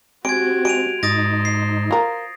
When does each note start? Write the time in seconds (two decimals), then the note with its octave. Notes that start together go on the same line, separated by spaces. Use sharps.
0.25 G#3 C4 F#4 G4 G#6 D7
0.65 G#3 D7 D#7 F7
1.03 G#2 D#4 C5 D#6 A6 A#6
1.45 C7
1.91 F4 A#4